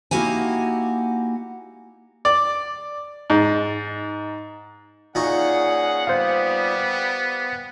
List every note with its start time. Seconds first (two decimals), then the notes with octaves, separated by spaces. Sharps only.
0.11 A#3 D#4 E4 F#4 G4 G#5
2.25 D5
3.30 G#2
5.15 A#2 C#4 D#4 G#4 F#5 C#6
6.07 G3 B3 C5 F5